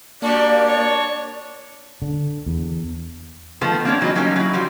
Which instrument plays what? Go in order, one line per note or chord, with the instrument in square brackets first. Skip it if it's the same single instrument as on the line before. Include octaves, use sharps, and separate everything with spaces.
[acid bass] A#3 [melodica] D4 [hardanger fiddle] F#4 G4 [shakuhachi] D5
[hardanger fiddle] C#5
[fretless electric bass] D3
E2
[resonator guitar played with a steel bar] D#3 F3 A3 B3 A4 C5
A#3 C4 D4 G4 C#5 D5
E3 F#3 D#4 F4 D#5
F#3 G3 A#3 C#4 D#4
F#3 E4
F3 G3 F#4 C5